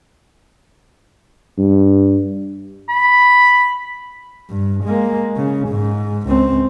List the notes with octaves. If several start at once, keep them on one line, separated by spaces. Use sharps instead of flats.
G2
B5
G2
G#3 A#3
C#3
G#2
C#2 C4